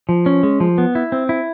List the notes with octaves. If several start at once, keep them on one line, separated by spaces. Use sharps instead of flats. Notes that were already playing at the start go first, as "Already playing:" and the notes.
F3
C#4
G#3
F3
B3
E4
C4
E4